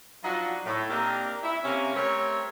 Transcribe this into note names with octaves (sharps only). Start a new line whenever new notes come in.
F3 F#3 D4 D#4 F4 F#4
A2
A#3 C4 D4 D#4 G4 A#4
E4
C3 A#3 C#4
G3 A3 C4 A#4 C#5